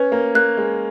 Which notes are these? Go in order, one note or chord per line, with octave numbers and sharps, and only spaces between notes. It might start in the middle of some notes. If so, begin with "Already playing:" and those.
Already playing: C#4 B4
A#3
A#3 F#6
G#3